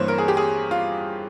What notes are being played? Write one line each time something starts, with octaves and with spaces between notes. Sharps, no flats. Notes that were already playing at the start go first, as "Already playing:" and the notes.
Already playing: G2 E3 A#3 C5 C#5
A#4
G#4
G4
G#4
F4